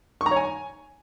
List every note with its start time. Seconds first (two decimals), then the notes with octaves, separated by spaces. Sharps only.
0.21 C#6
0.26 A#5
0.31 C#5
0.36 G#5